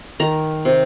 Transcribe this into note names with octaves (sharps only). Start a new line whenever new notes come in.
D#3 A#5
C3